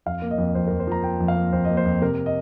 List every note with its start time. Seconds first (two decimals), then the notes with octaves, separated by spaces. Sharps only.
0.06 F2 F5
0.22 A#3
0.31 D#5
0.38 F2
0.55 F2 C5
0.67 A#4
0.71 F2
0.80 C5
0.87 F3 A#5
1.04 A#3 G5
1.20 F2
1.28 F5
1.37 A#3
1.52 F2 C5
1.65 A#3 D#5
1.77 C5
1.85 F2
2.01 C3 A#4
2.26 D#5